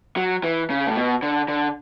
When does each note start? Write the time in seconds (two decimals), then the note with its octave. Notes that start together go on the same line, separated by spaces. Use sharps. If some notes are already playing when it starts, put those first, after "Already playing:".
0.17 F#3
0.44 E3
0.70 C#3
0.87 A2
0.96 B2
1.23 D3
1.48 D3